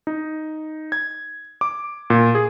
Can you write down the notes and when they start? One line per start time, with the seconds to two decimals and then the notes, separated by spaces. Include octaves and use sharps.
0.07 D#4
0.92 G#6
1.61 D6
2.10 A#2
2.35 G#4